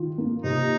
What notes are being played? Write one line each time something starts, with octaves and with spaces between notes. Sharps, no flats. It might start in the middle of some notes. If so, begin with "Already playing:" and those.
Already playing: D#3 F4
A#3
C3 D#4